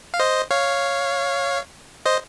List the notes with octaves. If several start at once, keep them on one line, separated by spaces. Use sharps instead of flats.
F5
C5 D#5
C#5 F5
C5 D#5